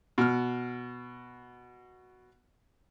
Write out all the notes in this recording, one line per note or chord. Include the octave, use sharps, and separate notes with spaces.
B2 F6